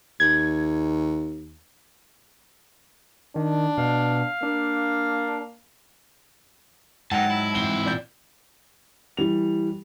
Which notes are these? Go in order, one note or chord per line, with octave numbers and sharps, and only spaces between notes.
D#2 G#6
D#3 D4
B2 F5
A#3 D4
G#2 D3 F#3 A#4 F#5 G5 A5
E4
E3 C4 G7
A#2 D5 G6
E3 G3 F7